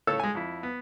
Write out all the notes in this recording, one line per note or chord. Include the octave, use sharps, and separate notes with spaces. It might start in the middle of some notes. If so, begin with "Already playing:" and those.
A2 C#3 A4 C#5 E6
G#3 G#5
F2 E4
B3